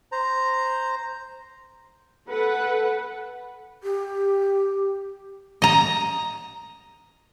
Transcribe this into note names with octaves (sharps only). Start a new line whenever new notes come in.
C5 A#5
A4 B4 F#5
G4
D#5 A#5